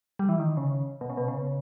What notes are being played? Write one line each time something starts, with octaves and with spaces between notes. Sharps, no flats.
G3
E3
D#3
C#3
B2
C#3
B2
C#3